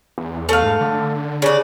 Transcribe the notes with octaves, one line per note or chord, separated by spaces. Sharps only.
E2
A3 F5
G#2
D3
C#3 D4